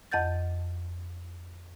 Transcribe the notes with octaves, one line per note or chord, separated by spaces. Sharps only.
F2 D#5 F#5 G6 A6